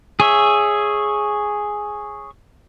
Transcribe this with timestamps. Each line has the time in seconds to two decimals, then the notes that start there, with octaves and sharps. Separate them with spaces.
0.20 G#4 C#5 E5